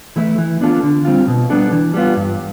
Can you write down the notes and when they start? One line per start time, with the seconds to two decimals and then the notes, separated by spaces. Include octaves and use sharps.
0.16 E3 A3 E4
0.38 E3
0.61 B3 D4 F4 A4
0.83 D3
1.05 G3 C4 F4
1.27 B2
1.50 G3 B3 D4 A4
1.72 E3
1.94 G3 B3 F4
2.17 G2